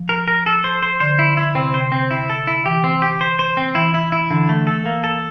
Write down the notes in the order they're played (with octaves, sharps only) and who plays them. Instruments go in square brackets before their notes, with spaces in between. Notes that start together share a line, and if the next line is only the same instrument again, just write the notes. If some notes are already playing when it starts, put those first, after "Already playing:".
Already playing: [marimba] F3
[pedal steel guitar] A#4
A#4
A4
C5
C5
[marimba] D3 [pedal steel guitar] C5
[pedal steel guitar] E4
E4
[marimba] C3 [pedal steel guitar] C4
[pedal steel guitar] C5
C4
E4
A4
E4
[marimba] E3 [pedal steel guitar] G4
[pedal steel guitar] C4
G4
C5
C5
C4
[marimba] E3 [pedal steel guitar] E4
[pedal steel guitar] E4
E4
[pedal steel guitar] D3 [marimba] E3
[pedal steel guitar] A3
A4
A#3
A4